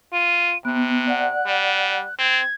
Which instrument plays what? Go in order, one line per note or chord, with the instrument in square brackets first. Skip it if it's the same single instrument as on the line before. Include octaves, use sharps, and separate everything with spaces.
[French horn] F4 [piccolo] D#7
[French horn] C3 [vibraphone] B3 [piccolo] F#6
[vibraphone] D5 F#5
[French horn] G3
[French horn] C4 [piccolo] G#6